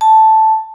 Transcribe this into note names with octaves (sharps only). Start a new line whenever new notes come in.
A5